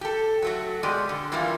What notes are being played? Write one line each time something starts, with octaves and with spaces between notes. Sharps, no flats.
G4 A4
F#3 A3 F#4
B2 G#3 G4 D5
D3
E3 G3 A#3 E4 F4